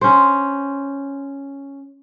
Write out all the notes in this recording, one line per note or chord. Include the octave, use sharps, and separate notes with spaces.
C#4 C5